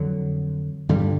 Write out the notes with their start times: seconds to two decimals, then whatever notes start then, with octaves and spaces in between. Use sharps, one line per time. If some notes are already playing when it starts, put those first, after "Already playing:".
Already playing: F2 D3 F#3
0.89 G2 D3 G3